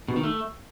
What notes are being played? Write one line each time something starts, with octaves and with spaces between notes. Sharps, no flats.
B2
D#3
A3